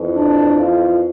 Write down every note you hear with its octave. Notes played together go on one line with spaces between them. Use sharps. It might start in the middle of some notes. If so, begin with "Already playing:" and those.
Already playing: F2 E3
D4
F4